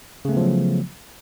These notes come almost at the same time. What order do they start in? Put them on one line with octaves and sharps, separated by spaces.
C#3 A3 B3 F3 F#3